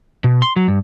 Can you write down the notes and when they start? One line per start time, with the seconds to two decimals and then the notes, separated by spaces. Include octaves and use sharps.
0.24 B2
0.42 C6
0.56 F#3
0.68 G2